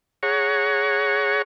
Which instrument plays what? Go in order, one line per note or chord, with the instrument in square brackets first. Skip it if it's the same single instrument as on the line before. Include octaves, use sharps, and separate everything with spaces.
[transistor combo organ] G#4 C#5 F#5 A#5 C#6